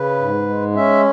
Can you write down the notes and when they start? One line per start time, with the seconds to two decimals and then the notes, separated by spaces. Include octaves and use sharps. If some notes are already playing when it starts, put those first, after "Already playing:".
Already playing: C#3 B4
0.20 G#2
0.48 G#3
0.76 C#4 E5